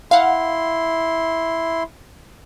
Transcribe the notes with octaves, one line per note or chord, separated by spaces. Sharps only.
E4 F5 F#5 C6